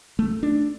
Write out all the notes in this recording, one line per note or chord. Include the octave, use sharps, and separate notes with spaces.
A3
D4